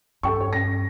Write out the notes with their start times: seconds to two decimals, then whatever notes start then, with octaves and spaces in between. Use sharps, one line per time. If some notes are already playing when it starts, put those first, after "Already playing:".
0.23 G2 A4 G5 C#6
0.40 C#5
0.53 A#6